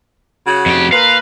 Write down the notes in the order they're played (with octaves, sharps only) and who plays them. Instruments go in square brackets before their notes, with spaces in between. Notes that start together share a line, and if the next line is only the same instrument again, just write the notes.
[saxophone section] C#3 F#3 F#4
[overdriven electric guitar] F2 G4
[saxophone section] A#2 A#4 B4 [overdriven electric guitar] F5